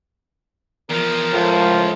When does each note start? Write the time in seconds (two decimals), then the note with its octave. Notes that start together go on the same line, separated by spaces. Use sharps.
0.90 E2 F3 A#4
1.33 C#2 A2 F3